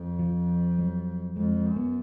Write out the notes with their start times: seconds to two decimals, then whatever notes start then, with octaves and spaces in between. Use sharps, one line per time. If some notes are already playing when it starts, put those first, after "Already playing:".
Already playing: F2
0.19 F3
0.78 F#3
1.36 F2 G#3
1.56 G#3
1.66 F#2
1.76 B3